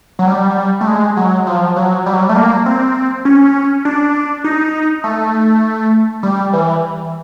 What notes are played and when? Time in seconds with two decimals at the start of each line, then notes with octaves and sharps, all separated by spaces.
0.19 F#3
0.27 G3
0.81 A3
0.87 G#3
1.17 F#3
1.47 F3
1.76 F#3
2.06 G3
2.13 F#3
2.21 G3
2.29 A3
2.36 A#3
2.66 C4
3.25 C#4
3.85 D4
4.44 D#4
5.04 A3
6.23 G3
6.53 E3